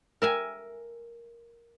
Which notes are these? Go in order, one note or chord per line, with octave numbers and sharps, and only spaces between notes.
A#4 E5 G#5